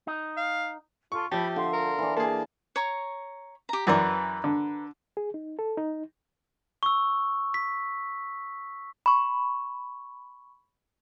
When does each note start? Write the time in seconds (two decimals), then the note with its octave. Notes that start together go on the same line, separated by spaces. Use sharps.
0.07 D#4
0.37 F5
1.12 F4 A4 C#6
1.32 F3 G4 E5 A5 B5
1.56 D3 F4 C6
1.73 A#4
1.98 E3 D4
2.17 A#3 G#4 A5
2.76 C#5 A#5 C#6
3.69 G4 A#5
3.87 F#2 E3 A#4 B4 D5 C#6
4.44 D3
5.17 G#4
5.34 D#4
5.59 A4
5.77 D#4
6.83 C#6 E6
7.54 B6
9.06 B5 C#6